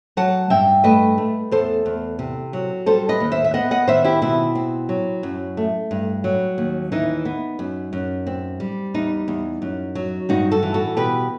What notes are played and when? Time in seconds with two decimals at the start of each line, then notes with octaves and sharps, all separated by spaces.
0.17 F#3 F#5 A5
0.50 G2 E5 G5
0.84 A3 B4 D#5
1.18 A3
1.51 E2 A4 C5
1.86 E2
2.19 C3
2.53 F#3
2.86 G3 A4 C5
3.09 B4 D#5
3.20 D#2
3.32 C5 E5
3.45 E5
3.54 B3 D#5 F#5
3.71 D#5 F#5
3.88 D#3 C5 E5
4.04 E4 G4
4.22 B2 C4 E4
4.55 C4
4.89 F#3
5.23 F#2
5.57 A3
5.91 G2
6.24 F#3
6.58 D#2
6.92 E3 D#4
7.25 B3
7.59 F#2
7.93 F#2
8.27 C4
8.60 G3
8.94 E2 D#4
9.28 E2
9.62 F#2
9.95 F#3
10.29 G2 D#4 F#4
10.52 F#4 A4
10.63 E3
10.74 F#4 A4
10.97 B2 G4 B4